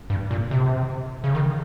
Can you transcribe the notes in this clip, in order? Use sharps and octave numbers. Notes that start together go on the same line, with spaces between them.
G2
A#2
C3
C#3
D#3